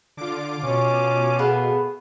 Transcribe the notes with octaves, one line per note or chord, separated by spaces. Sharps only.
D3 F4 D6
B2 C#4
A3 B3 G#4 F5